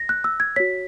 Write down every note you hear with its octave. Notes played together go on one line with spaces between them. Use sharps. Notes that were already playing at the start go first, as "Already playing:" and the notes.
Already playing: A#6
F#6
E6
G#6
F#4 C#5 B6